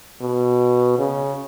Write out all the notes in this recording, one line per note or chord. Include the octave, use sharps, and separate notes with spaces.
B2
C#3